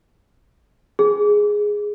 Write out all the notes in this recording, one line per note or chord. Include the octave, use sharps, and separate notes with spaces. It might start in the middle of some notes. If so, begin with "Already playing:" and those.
G#4